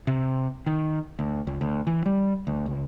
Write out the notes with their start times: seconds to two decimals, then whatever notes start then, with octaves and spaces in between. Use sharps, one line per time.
0.07 C3
0.66 D#3
1.19 D2
1.47 C#2
1.61 D2
1.87 E3
2.06 G3
2.47 D2
2.66 C#2